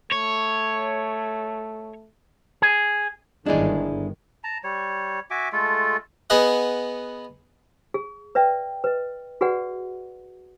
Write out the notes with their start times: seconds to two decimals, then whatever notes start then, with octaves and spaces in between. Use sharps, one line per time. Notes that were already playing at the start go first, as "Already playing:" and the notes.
0.12 A3 C#5
2.62 G#4
3.46 G1 D#3 G#3 D4 E4 G#4 D5
4.44 A5 A#5
4.64 G3 C#5
5.30 F#4 E5 G#5 D6
5.52 G#3 A3 F4 A4
6.30 B3 G#4 D#5 F#5
7.94 G#4
8.35 B4 D5 E5 G5
8.84 B4 D#5
9.41 F#4 G#4 B4 D5 F#5